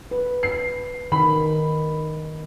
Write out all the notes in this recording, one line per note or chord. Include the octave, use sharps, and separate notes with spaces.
B4
C7
D#3 B5